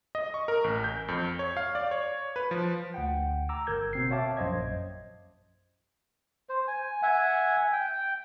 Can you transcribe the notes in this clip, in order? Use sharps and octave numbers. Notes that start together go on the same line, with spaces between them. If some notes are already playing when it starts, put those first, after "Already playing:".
D#5
C#6
A#4
A1
G6
F2
C#5
F5
D5
C#5
B4
F3
D2 F#5 G5
A#5 D6 E6
G1 A#4 E6 G6 G#6
B2 C4 C7
C#5 E5 F5 G5 A5 D6
A#1 F#2 C5 D#5 G#6
C5
G#5
E5 F#5 G#5
G5